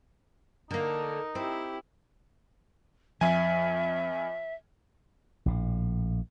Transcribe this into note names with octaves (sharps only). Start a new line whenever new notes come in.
D3 A#3 D#4 A#4
C4 E4 G4
F2 F3 E5 G#5
A#1 A2